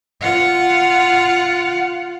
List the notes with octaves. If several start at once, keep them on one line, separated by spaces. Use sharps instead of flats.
F4 F#5